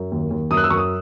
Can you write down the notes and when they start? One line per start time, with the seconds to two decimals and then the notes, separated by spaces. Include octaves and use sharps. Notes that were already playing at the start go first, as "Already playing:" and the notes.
Already playing: F#2
0.12 D#2
0.31 D#2
0.51 F#2 D#6
0.57 F#6
0.64 E6
0.70 F#2 C#6
0.77 D#6